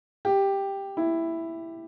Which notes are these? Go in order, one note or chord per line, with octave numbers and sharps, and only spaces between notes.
G4
E4